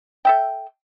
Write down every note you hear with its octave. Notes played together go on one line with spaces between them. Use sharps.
A4 E5 G5